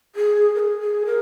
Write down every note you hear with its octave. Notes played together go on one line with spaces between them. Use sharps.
G#4
A#4
G#4
G#4
A#4